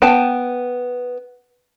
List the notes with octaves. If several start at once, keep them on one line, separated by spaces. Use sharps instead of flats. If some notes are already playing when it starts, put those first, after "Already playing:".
B3 G5 A5